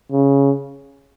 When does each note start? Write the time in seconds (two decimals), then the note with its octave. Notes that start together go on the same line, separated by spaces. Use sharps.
0.12 C#3